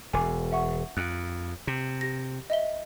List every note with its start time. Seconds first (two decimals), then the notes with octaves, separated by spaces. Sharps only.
0.13 E1 G#5 D6
0.52 E5 F#5 C#6
0.97 F2 F#6
1.67 C3 C7
2.01 G4 A#6
2.50 D#5 E5 G7